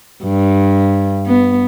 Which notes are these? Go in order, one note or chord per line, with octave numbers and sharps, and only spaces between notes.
G2
B3